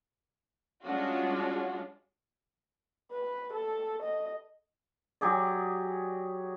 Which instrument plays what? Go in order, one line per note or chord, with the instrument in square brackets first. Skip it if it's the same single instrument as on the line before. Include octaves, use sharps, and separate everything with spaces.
[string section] G3 G#3 C#4 D4 F4 F#4
[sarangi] B4
A4
D#5
[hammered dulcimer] F#3 G4 G#4 D5